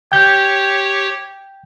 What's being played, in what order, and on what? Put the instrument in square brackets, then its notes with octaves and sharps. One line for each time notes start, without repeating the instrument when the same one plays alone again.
[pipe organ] G4 C#5 [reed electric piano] G5 G6